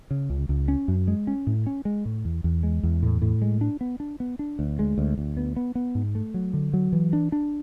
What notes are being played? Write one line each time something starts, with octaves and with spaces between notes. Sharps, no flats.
C#3
C#2
C#2
C#4
F#2
G#3
C#4
A2
C#4
G#3
A2
E2
E2
G#3
E2
A2
A2
G#3
D4
B3
D4
B3
D4
D2
G#3
D2
D2
B3
B3
B3
G#2
A3
F#3
D3
F#3
E3
D4
D4